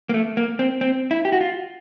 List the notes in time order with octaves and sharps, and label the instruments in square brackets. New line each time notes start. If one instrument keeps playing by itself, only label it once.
[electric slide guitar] A#3
A3
A#3
C4
C4
E4
G4
F#4
F4